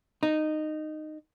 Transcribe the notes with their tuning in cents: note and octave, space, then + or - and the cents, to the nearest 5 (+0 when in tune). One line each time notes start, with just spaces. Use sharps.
D#4 -15